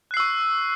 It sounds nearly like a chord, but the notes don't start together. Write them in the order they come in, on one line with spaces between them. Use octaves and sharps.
F#6 C7 E6 C#6